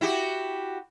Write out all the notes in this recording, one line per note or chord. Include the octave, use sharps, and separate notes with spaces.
E4 F#4 G4